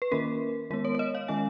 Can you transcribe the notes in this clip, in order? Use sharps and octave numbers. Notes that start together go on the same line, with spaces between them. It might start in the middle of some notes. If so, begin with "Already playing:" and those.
B4
D#3 A#3 C#4 A#4
D#3 G#3 B3 A#4
C#5
C#5
D#5
F5
D#3 G#3 C#4 G#5